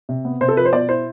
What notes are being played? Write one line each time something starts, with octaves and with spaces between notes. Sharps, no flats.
C3
B3
C3 C5
A4
F3 B4
C5
B2 D5
E4 C5